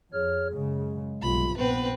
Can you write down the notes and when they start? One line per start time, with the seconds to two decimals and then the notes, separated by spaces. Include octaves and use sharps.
0.13 F2 G#4 C#5 F6
0.54 F#2 C#3 G#3
1.22 B1 G2 C3 F4 B5
1.57 A#1 B3 C4 B4